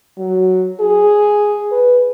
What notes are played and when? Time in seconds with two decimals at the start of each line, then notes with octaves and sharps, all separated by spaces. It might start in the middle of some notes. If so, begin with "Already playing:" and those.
0.18 F#3
0.80 G#4
1.72 B4